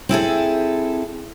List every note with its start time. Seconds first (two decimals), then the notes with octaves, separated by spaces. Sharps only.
0.09 C4 E4 G#4 A4